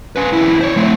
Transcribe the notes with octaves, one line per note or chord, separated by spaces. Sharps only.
C#4 B4
D#2 E4
C5 C#5
A3 C4